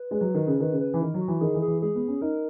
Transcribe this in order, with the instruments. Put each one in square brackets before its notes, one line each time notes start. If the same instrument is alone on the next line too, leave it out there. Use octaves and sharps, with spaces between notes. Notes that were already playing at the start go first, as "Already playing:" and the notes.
Already playing: [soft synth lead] B4
[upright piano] G#3
F#3
D#3
C#3
[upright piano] D#3 [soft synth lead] B4
[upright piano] C#3
[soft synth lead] B4
[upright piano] E3
[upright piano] D#3 [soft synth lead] A#4
[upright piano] F#3
[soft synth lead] F#4
[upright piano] E3
[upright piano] D#3 [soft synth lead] G#4
[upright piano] E3
[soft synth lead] G#4
[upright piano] E3
[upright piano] G#3 [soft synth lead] G#4
[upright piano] B3
C#4
[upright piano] D#4 [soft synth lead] A#4